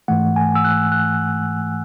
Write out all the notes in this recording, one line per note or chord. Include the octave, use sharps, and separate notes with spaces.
G#2 E3 A3 F#5
G#5
E6
F#6
F#6